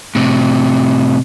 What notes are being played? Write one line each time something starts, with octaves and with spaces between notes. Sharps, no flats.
A2 C3